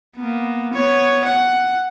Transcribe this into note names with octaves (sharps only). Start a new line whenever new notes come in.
A#3 B3
B3 C#5
F#5